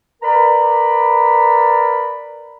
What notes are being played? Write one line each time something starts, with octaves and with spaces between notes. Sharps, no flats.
A#4 B4 D5 A#5 B5